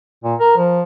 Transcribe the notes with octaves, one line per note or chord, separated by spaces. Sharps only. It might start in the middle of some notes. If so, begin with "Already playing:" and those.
A#2
A#4
F3